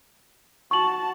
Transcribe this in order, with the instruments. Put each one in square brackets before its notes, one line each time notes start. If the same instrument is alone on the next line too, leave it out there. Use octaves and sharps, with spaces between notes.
[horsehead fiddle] F#4 A5 [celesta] C#6 F#7